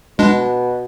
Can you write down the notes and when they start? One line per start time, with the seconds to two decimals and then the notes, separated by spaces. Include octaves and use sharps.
0.19 B2 G#3 D4